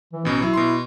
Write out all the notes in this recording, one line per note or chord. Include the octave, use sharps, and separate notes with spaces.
E3
A1 B2 C#4
F#3 E4
B2 C6